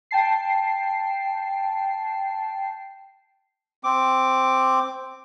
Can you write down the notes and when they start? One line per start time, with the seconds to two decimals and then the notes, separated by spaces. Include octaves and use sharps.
0.11 G5 A5 C7
3.84 C4 D6